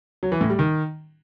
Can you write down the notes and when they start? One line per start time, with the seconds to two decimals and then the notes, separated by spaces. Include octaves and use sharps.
0.23 F#3
0.32 E3
0.41 A2
0.50 G3
0.59 D#3